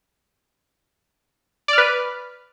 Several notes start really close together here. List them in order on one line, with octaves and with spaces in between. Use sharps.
D5 F6 B4